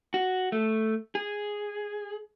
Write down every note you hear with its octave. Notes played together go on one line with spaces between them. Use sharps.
F#4
A3
G#4